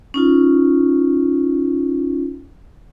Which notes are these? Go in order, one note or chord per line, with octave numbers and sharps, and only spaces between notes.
C#4 D#4 F4